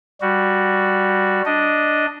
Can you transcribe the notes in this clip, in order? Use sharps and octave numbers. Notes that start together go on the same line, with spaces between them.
G3 F#4
D4 D#5